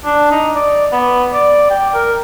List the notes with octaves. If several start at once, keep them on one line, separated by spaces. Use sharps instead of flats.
D4
D#4
D5
B3
D5
G5
A#4